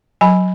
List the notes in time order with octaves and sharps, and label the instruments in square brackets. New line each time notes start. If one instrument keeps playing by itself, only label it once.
[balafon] F#3 G#5 B5